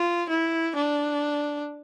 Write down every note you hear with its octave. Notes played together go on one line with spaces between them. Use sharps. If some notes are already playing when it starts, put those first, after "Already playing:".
Already playing: F4
E4
D4